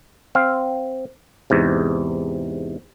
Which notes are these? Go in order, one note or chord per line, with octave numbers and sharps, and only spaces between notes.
C4 F5
E2 G#2 C3